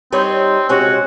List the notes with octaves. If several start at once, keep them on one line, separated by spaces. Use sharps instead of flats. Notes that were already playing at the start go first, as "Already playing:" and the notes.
G3 C4 D#4 C#5
C3 G#3 C#4 F#4